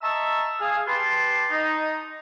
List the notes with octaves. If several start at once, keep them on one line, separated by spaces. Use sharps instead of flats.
D#5 E5 A5 A#5 C#6 E6
G#4 F5
G4 B4 A5 C6
D#4